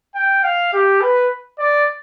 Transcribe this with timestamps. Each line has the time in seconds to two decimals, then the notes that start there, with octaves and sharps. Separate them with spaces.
0.15 G5
0.43 F5
0.73 G4
1.01 B4
1.59 D5